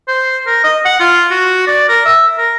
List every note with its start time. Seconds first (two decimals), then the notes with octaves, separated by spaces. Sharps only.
0.08 C5
0.47 A#4
0.64 D#5
0.85 F#5
1.00 F4
1.31 F#4
1.67 D5
1.89 A#4
2.05 E5
2.38 A#4